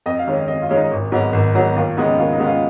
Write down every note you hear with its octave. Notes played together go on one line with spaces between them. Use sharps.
F2 D#5
F5
D#3 G#3 C#4
D#5
F2 D#5
F4
D#3 G#3 C#4
D#4
G#1
G#2 F#3 B3
G#1
G#2 F#3 B3
D#2 F4
C#3 G#3 B3 D#4
D#2 F4
D#4
C#3 G#3 B3
F4